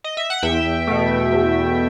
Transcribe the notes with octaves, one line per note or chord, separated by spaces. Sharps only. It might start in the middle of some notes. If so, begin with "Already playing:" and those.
D#5
E5
F#5
E2 E5 G5
B2 A3
E2